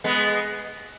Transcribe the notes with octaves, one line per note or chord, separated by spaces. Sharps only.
G#3 B3